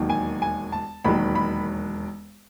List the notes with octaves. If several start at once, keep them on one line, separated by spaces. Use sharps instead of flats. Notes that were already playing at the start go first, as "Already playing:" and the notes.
Already playing: E1 D#2 D#3 F#3
G#5
G#5
A5
E1 D#2 D#3 F#3 B5
B5